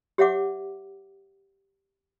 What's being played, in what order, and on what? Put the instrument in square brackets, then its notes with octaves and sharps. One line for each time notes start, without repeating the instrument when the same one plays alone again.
[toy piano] G4 C#5 E5 F#5 D6